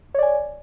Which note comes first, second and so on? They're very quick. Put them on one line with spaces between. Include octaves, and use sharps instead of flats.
C#5 D5 G#5